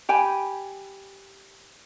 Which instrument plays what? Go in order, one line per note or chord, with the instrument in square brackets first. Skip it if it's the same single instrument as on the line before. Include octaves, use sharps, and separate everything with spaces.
[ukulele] G4 G5 G#5 B5